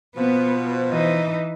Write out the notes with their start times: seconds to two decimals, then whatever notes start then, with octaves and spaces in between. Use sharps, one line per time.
0.16 B2 F3 B3
0.90 E3 D#4